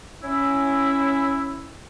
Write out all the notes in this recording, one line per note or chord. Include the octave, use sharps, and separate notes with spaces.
C#4 E4